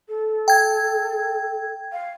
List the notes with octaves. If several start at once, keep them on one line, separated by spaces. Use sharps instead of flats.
A4
G5 G#6
F5